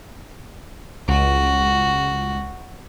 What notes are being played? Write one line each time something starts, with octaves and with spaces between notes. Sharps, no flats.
C#2 F#4